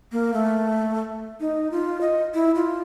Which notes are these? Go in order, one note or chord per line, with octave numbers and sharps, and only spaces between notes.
A#3
A3
D#4
F4
D#5
E4
F4